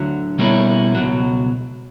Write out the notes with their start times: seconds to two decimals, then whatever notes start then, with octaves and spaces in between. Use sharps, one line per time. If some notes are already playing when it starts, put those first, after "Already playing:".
Already playing: D2 D3 F#3
0.38 B2 G3 A#3 C#4 E4
0.95 C#2 B2 F#3